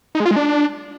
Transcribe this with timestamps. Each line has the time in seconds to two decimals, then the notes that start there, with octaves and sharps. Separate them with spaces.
0.15 D#4
0.20 G#3
0.26 F4
0.31 G#3
0.36 D4